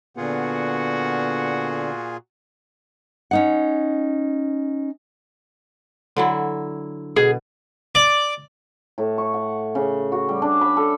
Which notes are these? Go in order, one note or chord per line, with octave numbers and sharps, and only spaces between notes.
A#2 D3 B3 F4 F#4 G#4 F#5
C#4 D#4 F#5
D3 F#3 E4
B2 G#4
D5
A2
C#6
F#5
C#3
F#4
G3
D4
B5
A4